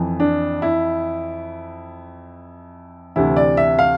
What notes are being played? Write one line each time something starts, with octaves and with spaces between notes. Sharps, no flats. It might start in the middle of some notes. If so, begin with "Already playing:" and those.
Already playing: F2 E3
D4
E4
D2 C3 E3 E4
D5
E5
F5